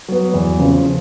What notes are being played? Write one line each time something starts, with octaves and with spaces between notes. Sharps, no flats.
F#3 B3
E2
C#3 F3